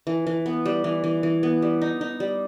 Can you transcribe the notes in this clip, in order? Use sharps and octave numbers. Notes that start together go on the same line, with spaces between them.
E3
E3
B3
G3
E3
E3
E3
B3
G3
D#4
D#4
G3